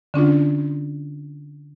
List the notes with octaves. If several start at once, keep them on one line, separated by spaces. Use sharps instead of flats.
D3 C#4 D4 F4